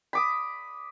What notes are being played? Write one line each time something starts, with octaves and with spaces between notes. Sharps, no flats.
B5 D6 D#6